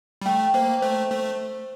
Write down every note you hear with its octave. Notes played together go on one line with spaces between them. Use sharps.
G3
A3 G5
A#3 C5
A3 C5
A3 C5